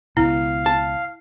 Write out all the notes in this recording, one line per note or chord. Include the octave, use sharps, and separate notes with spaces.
C#2 B2 E4 F5
A5